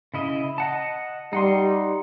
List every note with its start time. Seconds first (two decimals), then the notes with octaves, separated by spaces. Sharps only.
0.14 C#3 E4 D#5
0.58 D#5 F#5 A5
1.33 G3 D#4 F#5 C6